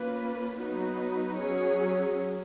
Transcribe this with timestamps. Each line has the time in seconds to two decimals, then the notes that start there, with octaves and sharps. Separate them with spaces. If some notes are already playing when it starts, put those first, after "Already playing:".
Already playing: A#3 C#4 F4 B4
0.57 F#3 B3 D#4 F#4 B4
1.36 F#3 C#4 G#4 C#5